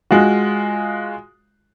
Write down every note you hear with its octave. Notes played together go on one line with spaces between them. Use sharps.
G#3 F4 F#4